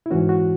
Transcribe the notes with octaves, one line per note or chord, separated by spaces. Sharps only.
E4
G#2 E3 C#4 F#4
F#4